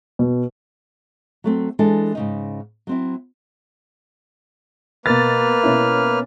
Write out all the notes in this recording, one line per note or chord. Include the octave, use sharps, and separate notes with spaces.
B2
F#3 A3 C4
E3 G#3 D4 E4 A4
G#2 C#3 D#4
F#3 C4 E4
B2 A#3 B4 F6 A6
B2 C#4 E4